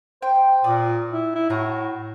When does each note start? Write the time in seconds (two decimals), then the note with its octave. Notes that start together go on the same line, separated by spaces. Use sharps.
0.22 C5 G5
0.64 A#2 D5 D#6
1.12 E4
1.35 E4
1.50 A2 F#4 A#5